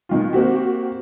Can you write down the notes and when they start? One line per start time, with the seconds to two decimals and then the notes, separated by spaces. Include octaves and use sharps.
0.09 B2 D#3 F4
0.33 A#3 C4 F#4 G4